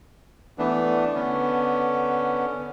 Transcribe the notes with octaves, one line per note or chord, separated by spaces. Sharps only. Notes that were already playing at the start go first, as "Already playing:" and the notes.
E3 A3 B3 D4
D3 B3 C#4